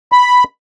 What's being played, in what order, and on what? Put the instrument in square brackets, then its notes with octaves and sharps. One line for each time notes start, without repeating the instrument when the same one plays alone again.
[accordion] B5